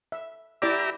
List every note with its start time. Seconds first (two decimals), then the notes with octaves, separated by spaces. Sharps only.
0.12 E5
0.62 E4 G4 D5 E5 A#5 D6